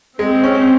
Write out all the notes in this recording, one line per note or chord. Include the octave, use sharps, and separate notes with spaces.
G#3 C4
C#4